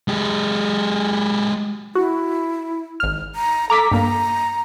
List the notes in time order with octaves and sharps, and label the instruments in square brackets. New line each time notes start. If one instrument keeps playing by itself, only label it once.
[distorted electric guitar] G#3 G4
[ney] E4 [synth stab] F#4
[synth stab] G#1 F6
[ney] A#5
[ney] A4 [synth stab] A#5 D6 B6
[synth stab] G2 A#3 [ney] A#5